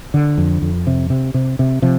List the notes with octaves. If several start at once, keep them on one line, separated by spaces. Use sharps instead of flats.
D3
F2
F2
C3
C3
C3
C3
C3 F3